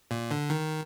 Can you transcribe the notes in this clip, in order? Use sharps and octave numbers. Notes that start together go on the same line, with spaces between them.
A#2
D3
D#3